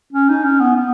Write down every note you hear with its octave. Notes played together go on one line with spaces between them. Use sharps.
C#4
D#4
C#4
B3
B3